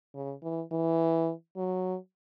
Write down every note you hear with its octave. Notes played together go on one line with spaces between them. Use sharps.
C#3
E3
E3
F#3